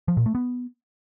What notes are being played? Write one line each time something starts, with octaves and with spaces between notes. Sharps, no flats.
F3
A#2
A3
B3